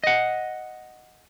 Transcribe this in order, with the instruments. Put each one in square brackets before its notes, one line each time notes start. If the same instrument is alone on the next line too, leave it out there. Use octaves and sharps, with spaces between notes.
[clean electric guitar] D#5 F#5